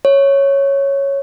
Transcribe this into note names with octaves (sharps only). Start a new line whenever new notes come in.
C#5